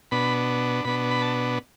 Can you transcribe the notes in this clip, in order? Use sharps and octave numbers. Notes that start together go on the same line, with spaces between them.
B2 B3 D4 B5
B2 B3 D4 B5
B5
A5